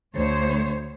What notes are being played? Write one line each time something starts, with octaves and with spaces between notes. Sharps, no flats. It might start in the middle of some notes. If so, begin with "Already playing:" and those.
D2 C5 C#5